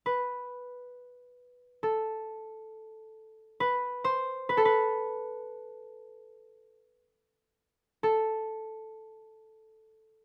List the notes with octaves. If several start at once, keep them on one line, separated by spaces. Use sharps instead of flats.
B4
A4
B4
C5
B4
A4
B4
A4